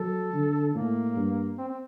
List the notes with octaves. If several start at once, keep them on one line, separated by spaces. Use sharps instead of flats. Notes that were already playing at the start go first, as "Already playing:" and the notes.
Already playing: F#3 A4
D3
A2 A#3
G2
C4
C4